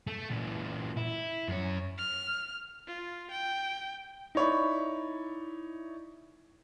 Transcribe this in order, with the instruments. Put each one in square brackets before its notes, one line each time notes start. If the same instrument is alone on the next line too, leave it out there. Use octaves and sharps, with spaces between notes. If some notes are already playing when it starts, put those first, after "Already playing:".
[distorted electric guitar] A3
A#2 E3
E4
F#2 C#5
[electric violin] F6
F4
G5
[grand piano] D#4 E4 C#5 D5 B5